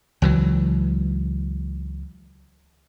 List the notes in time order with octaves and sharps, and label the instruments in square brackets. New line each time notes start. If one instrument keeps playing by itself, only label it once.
[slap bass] C#2 E3 F#3